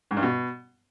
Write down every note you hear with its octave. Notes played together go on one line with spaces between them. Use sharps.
G#2
G2
B2